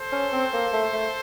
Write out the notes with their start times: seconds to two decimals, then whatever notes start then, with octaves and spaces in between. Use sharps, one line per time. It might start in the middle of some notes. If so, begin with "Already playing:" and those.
Already playing: A4 C5
0.12 C#4
0.32 C4
0.53 A#3
0.73 A3
0.93 A3